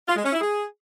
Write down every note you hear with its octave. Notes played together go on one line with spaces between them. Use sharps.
F4
G#3
C#4
E4
G#4